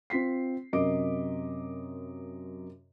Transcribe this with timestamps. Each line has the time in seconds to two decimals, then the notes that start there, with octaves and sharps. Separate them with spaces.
0.10 C4 F4 B6 C7
0.73 F#2 C3 A#4 D#5 D6 D7